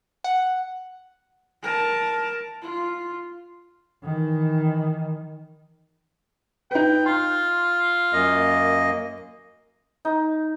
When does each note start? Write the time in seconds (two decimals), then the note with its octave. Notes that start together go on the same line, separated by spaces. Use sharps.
0.24 F#5
1.63 A#4 A5
2.62 F4
4.04 D#3 E3
6.71 D#4 B4 G5
7.06 F4 C6
8.13 F#2 A#3 D#5
10.05 D#4